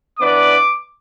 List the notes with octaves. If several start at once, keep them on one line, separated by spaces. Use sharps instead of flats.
E3 B3 D4 B4 D5 D6